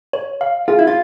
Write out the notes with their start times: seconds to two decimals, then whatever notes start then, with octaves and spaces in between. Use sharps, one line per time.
0.13 C#5
0.41 F5
0.68 F4 G#4
0.79 E4
0.87 F4